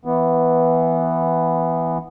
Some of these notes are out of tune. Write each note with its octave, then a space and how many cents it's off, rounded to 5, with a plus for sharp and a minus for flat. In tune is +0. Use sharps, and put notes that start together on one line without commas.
E3 +0 B3 +0